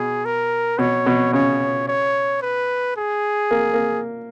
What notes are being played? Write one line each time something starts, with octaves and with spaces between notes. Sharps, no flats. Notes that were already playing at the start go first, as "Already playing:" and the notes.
Already playing: B2 G#4
A#4
B2 C#5
B2
C#3 C#5
C#5
B4
G#4
A#3
A#3